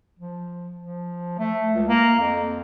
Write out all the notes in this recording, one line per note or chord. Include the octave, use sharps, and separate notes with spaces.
F3
F3
A3
C#2
A#3
F2